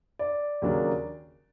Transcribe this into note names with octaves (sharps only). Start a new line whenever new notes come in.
D5
D#2 C#3 F#3 A#3 D4